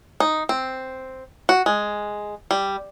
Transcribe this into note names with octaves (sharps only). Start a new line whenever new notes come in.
D#4
C4
F#4
G#3
G3